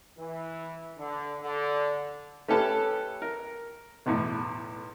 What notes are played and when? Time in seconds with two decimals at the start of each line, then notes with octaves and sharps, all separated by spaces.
0.19 E3
0.98 D3
1.42 D3
2.48 A3 C#4 G4 A4 B4
3.22 A#4
4.06 B1 E2 A2